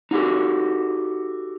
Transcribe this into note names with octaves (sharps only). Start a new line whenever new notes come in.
D#4 F#4 G4 A4